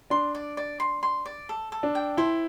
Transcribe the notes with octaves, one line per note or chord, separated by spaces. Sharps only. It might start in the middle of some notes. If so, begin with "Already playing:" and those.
D4 C6
D5
D5
C6
C6
D5
A4
A4
D4
G5
E4 C5